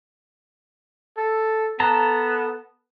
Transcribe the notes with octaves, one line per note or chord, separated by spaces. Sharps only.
A4
B3 A4 A5 A#5